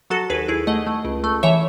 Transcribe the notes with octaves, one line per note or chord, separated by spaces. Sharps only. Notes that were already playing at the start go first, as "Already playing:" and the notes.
F#3 F#4 A4
D#2 G#4 B4
D#2 E4 G#4
A3 D#5 F#5
A3
C#2
A3
E3 C#5 E5